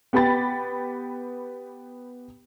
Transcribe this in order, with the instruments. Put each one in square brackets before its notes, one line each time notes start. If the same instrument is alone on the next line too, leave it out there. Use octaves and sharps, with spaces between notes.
[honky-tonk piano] B3 G4 G5 B5 A6